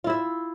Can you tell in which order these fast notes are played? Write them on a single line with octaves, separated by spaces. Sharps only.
F4 E4 E5